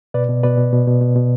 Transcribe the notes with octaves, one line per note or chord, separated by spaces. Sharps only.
B2 B4 D5
B2
B2 B4 D5
B2
B2
B2
B2
B2